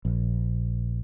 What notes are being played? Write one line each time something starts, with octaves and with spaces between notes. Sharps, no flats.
A#1